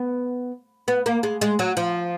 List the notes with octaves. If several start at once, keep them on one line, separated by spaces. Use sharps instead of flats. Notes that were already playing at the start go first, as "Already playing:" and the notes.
Already playing: B3
B3
A#3
G#3
G#3
F#3
F3